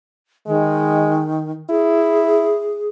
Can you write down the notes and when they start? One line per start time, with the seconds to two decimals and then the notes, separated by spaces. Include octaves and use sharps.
0.47 D#3 G#3
1.70 E4 G#4